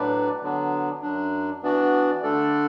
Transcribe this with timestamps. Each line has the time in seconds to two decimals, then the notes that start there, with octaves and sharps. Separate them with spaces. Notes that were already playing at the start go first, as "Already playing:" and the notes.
Already playing: A2 F#3 D4 B4 D5
0.41 D3 F#3 B3 D4
1.02 F#2 F#3 D4
1.63 E3 B3 D4 F#4 D5
2.22 D3 A3 D4 A4 D5